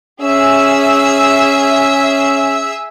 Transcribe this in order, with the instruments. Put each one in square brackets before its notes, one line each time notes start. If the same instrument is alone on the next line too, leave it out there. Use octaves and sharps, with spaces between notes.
[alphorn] C#4 [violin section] G#4 E5 E6